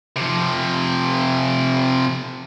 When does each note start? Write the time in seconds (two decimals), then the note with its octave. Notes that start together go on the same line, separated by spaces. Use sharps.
0.17 C3 F3